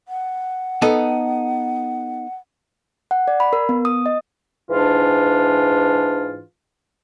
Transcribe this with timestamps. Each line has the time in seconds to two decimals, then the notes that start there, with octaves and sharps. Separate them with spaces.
0.08 F#5
0.82 B3 D#4 A4
3.11 F#5
3.28 D5
3.40 B5
3.53 A#4
3.69 B3
3.85 D#6
4.06 D#5
4.70 G#2 E3 D4 F4